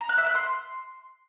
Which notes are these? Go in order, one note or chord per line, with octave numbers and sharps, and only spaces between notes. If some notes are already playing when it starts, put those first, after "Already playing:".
A#5
F#6
E5
F#6
C6